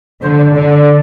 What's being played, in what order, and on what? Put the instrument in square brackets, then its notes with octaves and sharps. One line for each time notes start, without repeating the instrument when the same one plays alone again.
[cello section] D3 [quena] C5
[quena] D5
[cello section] D3 [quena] D5
[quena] D5